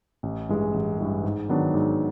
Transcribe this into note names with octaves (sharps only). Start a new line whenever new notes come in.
A1
G2 E3 G#3
A1
G2 E3 G#3
G#2
D#3 F#3 B3 D4
G#2